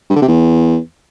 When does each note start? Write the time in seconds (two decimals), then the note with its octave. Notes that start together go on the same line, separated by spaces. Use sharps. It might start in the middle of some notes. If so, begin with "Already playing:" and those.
0.10 G2
0.16 D3
0.22 C3
0.28 E2